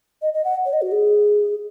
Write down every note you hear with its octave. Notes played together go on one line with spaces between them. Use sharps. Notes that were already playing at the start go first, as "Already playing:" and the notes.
D#5
D#5
F#5
C#5
D#5
F#4
G#4